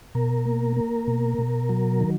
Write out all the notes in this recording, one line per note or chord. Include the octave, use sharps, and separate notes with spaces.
B2 A#4
A#3
A#3
B2
B2
F#3
D#3